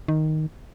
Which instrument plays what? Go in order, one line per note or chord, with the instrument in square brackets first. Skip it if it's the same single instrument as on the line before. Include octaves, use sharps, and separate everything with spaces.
[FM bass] D#3